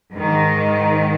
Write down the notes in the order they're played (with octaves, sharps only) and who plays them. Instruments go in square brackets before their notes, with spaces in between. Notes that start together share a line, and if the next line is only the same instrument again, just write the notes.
[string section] G#2 D#3